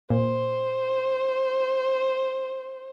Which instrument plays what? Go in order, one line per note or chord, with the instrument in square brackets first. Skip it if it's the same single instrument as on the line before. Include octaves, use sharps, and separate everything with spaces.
[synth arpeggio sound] A#2 [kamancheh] C5